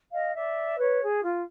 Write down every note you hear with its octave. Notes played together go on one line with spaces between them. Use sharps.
D#5 F5
D5 E5
B4 C#5
G#4
F4